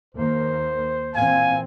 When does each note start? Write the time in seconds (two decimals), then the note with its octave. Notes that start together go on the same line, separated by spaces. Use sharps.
0.15 D#2 A#3 C5
1.15 A#2 E3 C4 F5 G#5